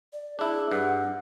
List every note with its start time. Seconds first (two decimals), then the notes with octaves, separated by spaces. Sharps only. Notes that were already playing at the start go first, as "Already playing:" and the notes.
0.13 D5
0.39 D4 E4 G#4
0.71 G2 F#5